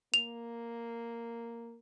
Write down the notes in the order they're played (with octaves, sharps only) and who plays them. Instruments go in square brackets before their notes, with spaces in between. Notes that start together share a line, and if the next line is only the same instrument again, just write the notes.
[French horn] A#3 [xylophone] F7